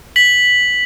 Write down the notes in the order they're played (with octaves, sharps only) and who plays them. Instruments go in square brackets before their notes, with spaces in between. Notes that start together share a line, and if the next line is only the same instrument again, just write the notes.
[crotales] B6 F#7